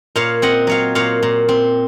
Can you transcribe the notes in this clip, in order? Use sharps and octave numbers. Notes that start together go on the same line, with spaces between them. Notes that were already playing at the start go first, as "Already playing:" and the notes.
A#2 C#5 F5
C4 D#5 F#5
F#3 C#5 F5
A#2 C#5 F5
A#2
C4